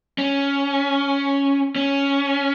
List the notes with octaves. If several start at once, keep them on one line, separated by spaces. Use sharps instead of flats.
C#4
C#4